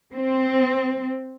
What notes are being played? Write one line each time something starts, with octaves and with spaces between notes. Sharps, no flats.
C4